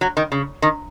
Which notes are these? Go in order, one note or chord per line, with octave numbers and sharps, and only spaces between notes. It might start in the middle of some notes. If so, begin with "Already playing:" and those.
F#3
D#3
C#3
D#3